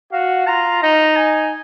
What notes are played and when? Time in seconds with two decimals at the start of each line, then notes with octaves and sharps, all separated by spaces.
0.12 F#4 F5
0.47 F4 A#5
0.82 D#4 A#5
1.17 G#5